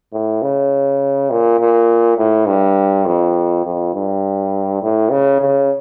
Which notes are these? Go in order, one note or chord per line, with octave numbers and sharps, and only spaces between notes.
A2
C#3
A#2
A#2
A2
G2
F2
F2
G2
A2
C#3
C#3